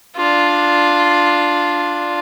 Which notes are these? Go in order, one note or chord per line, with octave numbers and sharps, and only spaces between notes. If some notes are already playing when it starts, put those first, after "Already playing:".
D4 F4